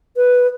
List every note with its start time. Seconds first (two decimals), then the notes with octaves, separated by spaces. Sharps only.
0.17 B4